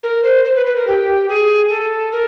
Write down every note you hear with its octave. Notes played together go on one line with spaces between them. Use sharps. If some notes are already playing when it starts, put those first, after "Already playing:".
A#4
C5
C5
B4
B4
A#4
G4
G#4
A4
A#4